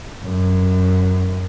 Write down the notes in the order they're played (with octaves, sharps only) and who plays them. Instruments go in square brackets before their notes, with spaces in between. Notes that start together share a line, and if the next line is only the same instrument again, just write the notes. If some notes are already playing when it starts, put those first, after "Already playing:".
[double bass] F#2